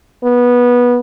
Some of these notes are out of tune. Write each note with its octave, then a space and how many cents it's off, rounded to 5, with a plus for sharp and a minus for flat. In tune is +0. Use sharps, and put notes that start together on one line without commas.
B3 -15